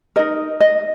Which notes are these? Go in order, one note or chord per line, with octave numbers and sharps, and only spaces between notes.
D#4 A#4 D#5
D#5